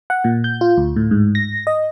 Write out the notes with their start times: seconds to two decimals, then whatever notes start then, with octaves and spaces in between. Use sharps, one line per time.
0.10 F#5
0.24 A#2
0.44 G6
0.61 F4
0.77 D2
0.96 A2
1.11 G#2
1.35 A#6
1.67 D#5